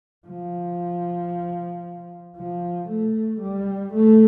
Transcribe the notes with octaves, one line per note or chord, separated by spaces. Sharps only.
F3
F3
A3
G3
A3